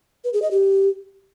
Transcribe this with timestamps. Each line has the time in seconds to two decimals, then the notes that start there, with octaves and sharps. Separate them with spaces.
0.24 B4
0.33 G#4
0.42 D#5
0.51 G4